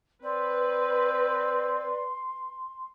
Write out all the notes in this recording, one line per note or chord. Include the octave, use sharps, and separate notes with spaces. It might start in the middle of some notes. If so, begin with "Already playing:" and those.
C4 B4 D5 C6